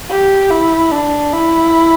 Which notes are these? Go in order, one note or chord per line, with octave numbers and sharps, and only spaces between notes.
G4
E4
D4
E4